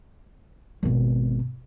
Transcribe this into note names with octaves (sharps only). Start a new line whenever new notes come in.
G#1 B2